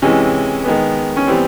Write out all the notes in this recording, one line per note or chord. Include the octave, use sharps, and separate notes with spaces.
C3 E3 G#3 C#4
D#3 G#3 B3
C#4
E3 G3 B3 C4